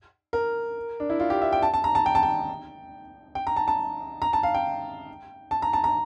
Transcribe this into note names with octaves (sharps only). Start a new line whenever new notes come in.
A#4
D4
E4
F4
G4
E5
G5
A5
A5
A#5
A5
G5
A5
G5
G5
A#5
A5
A5
A#5
A5
F5
G5
A5
A#5
A5
A#5